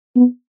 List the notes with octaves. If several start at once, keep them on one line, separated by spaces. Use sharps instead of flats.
B3